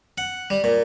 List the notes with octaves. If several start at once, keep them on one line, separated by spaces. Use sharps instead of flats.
F#5
G3
A#2